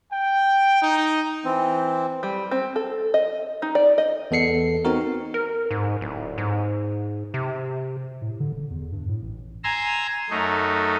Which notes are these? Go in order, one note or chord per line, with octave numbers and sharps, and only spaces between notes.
G5
D#4
E3 C4
G3
C4
A4
D#5
D#4
D5
D#5
E2 B3 A4 C7 C#7
B3 C4 D#4 F#4 A#4
A#4
G#2
D1
G#2
C3
A2
D3
D#1
E2
G2
A2
A1
G#5 A#5 C6 E6
F#2 A3 D#4